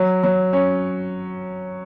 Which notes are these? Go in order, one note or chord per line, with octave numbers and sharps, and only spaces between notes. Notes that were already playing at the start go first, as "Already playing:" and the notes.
Already playing: F#3
F#3
C#4